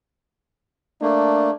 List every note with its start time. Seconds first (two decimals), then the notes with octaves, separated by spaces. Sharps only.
1.02 A3 A#3 D4